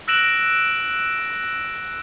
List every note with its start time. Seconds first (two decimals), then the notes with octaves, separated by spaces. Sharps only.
0.08 E6 F#6 A#6 D7 E7 F#7